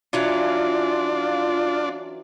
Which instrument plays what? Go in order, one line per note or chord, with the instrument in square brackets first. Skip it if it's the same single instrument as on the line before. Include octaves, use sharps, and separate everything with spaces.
[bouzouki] E3 F#3 C#4 [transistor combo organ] D4 [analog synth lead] F4